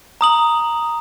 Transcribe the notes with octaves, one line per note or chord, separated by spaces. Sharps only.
A#5 D#6 F#7